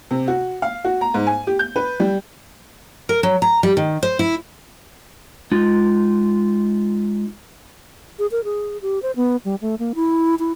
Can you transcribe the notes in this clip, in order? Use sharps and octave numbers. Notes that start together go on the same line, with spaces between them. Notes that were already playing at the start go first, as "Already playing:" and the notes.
C3
F#4
F5
F#4
A#5
G#2
G#5
G4
G6
B4
G3
A#4
F#3
A#5
G3
D#3
C5
E4
G#3 D#4 F4
G#4
A#4
G#4
G4
C5
B3
G3
A3
A#3
E4
E4